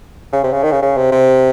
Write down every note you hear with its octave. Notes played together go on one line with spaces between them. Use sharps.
C#3
C3
C#3
D#3
C#3
C#3
C3
C3